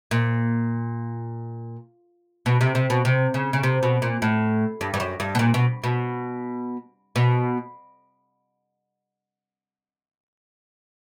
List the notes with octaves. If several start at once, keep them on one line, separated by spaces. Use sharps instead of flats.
A#2
B2
C3
C3
B2
C3
C#3
C#3
C3
B2
A#2
A2
G2
G2
F#2
G2
B2
A#2
B2
B2
B2